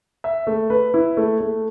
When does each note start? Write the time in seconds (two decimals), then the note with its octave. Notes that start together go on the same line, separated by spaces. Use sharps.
0.24 E5
0.47 A3
0.70 B4
0.94 E4
1.17 A3
1.40 A3